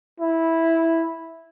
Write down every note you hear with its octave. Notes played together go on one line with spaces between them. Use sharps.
E4